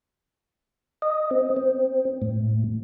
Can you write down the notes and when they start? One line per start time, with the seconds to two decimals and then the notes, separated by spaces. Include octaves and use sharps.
1.02 D#5
1.31 C4
1.56 C4
2.22 A2